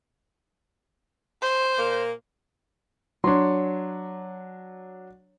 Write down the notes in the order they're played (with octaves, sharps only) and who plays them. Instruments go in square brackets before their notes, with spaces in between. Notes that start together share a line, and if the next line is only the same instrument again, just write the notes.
[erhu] C5
[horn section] A#2 A#3
[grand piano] F#3 D4 [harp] C#5 C6